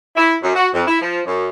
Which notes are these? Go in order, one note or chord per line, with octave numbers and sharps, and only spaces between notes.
E4
F#2
F#4
F2
E4
F3
F#2